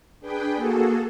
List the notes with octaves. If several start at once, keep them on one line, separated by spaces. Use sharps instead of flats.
D4 G#4 B4 G5
A#3 F#4 G#4 A4